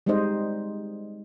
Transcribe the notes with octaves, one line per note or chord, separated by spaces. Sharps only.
G3 G#3 C4 D#4 C5 D#5